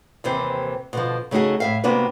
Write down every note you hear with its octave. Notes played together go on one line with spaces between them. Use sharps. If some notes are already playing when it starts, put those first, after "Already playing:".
D#2 C3 E3 C5
B2 D3 F3
C#3 A3 D#4 F#4 G#4
A2 E5 F5
C3 A#3 B3 D4 F#4 B4